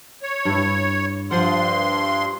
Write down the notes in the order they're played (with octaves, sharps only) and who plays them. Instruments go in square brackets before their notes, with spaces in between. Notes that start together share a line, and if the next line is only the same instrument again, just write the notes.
[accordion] C#5
[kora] G2 E4
[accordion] G2 C6 [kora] F3 F#5